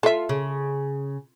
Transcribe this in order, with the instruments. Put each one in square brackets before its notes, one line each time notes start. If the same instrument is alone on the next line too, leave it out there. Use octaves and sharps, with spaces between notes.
[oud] F4 [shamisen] A4 E5
[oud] C#3